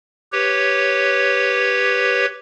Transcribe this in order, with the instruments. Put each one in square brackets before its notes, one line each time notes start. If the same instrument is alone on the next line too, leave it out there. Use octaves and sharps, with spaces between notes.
[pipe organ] G4 B4 C#5